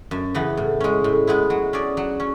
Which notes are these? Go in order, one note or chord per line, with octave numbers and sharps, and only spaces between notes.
F#2
C#3 E3 B3
A2
G#3 C#4
A2
G#3 B3 E4
F#3
C#4 G#4 D5
F#3
C#4